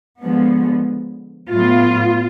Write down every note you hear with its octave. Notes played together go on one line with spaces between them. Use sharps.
D3 F3 G#3 B3
A2 F#3 B3 F4